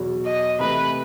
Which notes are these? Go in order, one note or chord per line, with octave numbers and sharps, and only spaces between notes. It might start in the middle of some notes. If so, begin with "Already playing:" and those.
Already playing: E2 B2 F#3
D#5
C3 E3 A3 B4